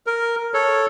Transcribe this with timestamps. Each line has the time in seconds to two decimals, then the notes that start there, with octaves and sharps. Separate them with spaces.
0.07 A#4
0.54 A4 C#5